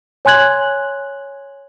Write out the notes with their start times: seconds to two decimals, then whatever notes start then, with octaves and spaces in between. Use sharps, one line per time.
0.25 C#5 G#5 C6 F#6 G#6 F#7